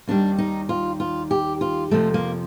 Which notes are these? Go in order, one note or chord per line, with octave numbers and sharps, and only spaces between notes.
D#2 D#3 G3 D4
D#4
F4
F4
G4
F4
F2 C3 F3 A3
A#3